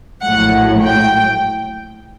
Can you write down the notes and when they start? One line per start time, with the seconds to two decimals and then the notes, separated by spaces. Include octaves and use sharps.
0.21 A#1 A2 F#3 F#5
0.82 G5